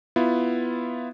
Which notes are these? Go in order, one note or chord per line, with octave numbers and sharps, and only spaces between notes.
B3 E4 F4